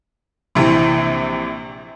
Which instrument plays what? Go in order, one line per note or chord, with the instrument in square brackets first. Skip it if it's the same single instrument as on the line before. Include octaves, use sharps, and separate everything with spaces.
[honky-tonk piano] A#1 C3 E3